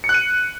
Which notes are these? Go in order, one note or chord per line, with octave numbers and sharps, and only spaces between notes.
C#7
F#6
D#7